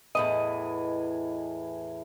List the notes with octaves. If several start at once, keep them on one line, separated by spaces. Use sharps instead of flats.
E2 A2 E3 D#5